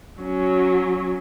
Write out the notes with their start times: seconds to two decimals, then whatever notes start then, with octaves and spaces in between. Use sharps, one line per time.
0.21 F#3 C#4